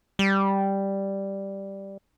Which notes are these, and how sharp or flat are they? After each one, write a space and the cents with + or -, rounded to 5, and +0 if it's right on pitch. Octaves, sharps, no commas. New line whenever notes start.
G3 +0